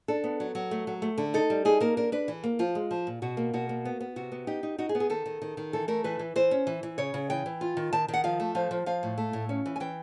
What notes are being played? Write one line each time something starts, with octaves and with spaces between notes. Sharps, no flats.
D4 A4
B3
F#3
F#3
A3
F#3
A3
D3
D#4 A4
G3
D#4 G#4
A#3 A#4
D4 A#4
D4 B4
E3
A#3
F3 F4
G#3
F3
A#2
B2 F#4
A#3
B2 F#4
A#3
B3
B3
C3 F#4
B3
D#4 G4
D#4
D#4 F#4
G#4
B3
G#4
D#3 A4
D#3
D#3
D#3
E3 A4
A3 A#4
E3 B4
E3
E3 C5
C#4
E3
E3
C#3 C#5
C#3
E3 G5
E3
F4
D#3
D#3 A5
D#3
F#5
F3 F5
A3
F3 F5
F3
F3 F5
A2
A3
A2
C#4
E3
G#5
E3 G5